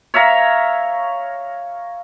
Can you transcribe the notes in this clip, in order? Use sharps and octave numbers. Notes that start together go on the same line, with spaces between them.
C#5 E5 F5 A#5